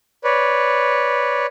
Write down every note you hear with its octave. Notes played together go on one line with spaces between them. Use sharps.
B4 C#5 D5